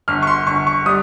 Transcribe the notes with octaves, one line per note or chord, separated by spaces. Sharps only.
G1 F6
C#6
C6
G1 C#6
C#6
G3 D#6